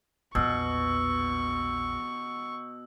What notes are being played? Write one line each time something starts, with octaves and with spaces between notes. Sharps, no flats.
A#1 E2 B2 C#6 E6